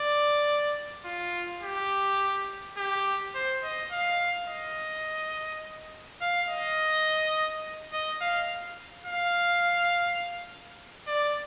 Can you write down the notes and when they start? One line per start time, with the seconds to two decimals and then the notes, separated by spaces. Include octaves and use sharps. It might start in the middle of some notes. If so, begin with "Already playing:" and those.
Already playing: D5
1.05 F4
1.62 G4
2.78 G4
3.35 C5
3.64 D#5
3.91 F5
4.49 D#5
6.21 F5
6.49 D#5
7.93 D#5
8.21 F5
9.06 F5
11.07 D5